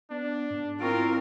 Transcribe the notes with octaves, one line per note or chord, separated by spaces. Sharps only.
B3 D4
G#2
C4 E4 F4 A#4 C#6 D7